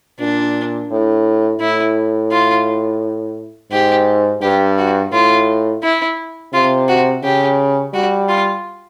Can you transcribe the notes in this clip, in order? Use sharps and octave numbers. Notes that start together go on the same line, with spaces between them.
A#2 D4
A2
A2 E4
F4
G#2 G4
G2 G4
F#4
A2 F4
E4
C3 F4
F#4
C#3 G4
G3 F#4
F4